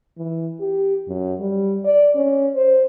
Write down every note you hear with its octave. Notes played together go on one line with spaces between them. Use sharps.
E3
G4
F#2
G3
D5
C#4
C5